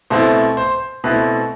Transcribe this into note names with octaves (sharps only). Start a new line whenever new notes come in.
B2 A3 C4 E4 C5
C5
B2 A3 C4 E4 B4